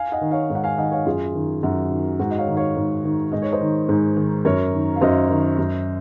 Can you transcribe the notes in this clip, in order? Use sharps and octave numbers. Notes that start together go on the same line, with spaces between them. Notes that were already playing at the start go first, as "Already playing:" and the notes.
Already playing: F5 G#5
D#5 F#5
D#3
C#5 F5
G#2
F#5
F5 G#5
D#3 D#5 F#5
C#5 F5
F#2 F4 G#4
D#3
F#2 F#4
D#3
G#2 F#4
D#5
C#5 F5
D#3
C#5 F5
G#2
D#3
G#2 D#5
C#5
C5 D#5
D#3
G#2
D#3
F#2 A#4 C#5
D#3
F5
F#2 C5 D#5
D#3
F#2